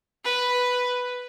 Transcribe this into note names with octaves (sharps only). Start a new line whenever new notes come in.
B4